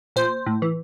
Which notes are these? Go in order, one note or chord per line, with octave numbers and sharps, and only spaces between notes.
A#2 C5
A2
E3